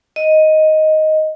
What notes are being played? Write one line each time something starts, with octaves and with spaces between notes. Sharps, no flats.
D#5